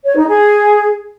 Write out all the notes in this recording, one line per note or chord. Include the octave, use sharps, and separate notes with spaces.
C#5
D#4
G#4